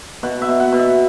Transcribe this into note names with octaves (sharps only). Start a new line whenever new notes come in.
B2 F#5
E5
B2
F#5
B2
E5